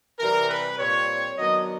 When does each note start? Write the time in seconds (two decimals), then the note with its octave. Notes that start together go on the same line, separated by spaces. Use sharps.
0.19 C3 E3 G3 A#4
0.49 B4
0.79 A#2 G3 C4 C#5
1.38 D#3 F#3 B3 D4 D#5